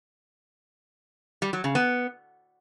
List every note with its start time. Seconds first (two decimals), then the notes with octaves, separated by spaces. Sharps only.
1.42 G3
1.53 F#3
1.64 C#3
1.75 B3